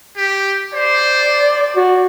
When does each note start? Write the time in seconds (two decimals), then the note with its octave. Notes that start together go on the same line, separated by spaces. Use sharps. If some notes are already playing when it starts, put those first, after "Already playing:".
0.17 G4
0.74 C5 D5
1.76 F#4